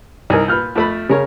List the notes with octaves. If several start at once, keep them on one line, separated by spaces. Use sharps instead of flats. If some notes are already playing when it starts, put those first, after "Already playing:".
C2 D#4 A#4 G#5
A#2 B4 F6 G6
F2 A3 B5
C#3 C#4 A#4 C#5